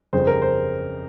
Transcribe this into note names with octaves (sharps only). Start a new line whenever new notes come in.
G1 F2 C#3 C5
A#4
C5